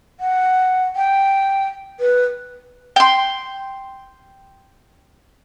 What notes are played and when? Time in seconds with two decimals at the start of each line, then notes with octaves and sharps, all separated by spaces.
0.20 F#5
0.96 G5
2.00 B4
2.96 G5 C6